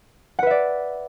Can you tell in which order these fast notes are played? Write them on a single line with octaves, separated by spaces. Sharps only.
F#5 B4 E5 D5